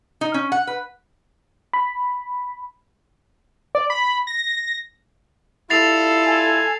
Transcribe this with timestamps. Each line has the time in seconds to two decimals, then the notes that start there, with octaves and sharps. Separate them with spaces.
0.21 D#4
0.34 C#4
0.52 F#5
0.67 B4
1.73 B5
3.75 D5
3.90 B5
4.27 A#6
5.70 G3 E4 F4 A4 A6 C7 F7
6.27 G#5